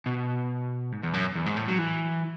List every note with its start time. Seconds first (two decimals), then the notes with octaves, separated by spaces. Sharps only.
0.06 B2
0.92 G#2
1.03 E2
1.14 F#2
1.35 E2
1.46 G#2
1.57 A2
1.68 F#3
1.78 E3